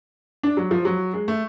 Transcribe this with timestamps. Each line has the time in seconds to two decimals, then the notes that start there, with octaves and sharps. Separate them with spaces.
0.43 D4
0.57 F#3
0.71 F3
0.85 F#3
1.13 G#3
1.28 A3